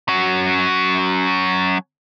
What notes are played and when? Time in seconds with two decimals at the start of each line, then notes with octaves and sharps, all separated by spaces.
0.08 F#3 C#4